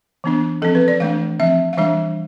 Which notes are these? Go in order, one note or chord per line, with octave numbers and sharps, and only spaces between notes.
E3 B3 D4
F3 C4 A4
B4
D5
E3 A3 D4 F5
F3 C4 E5
F5
E3 G3 D4 E5